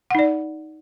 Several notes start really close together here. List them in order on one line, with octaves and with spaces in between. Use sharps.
F#5 D#4 D5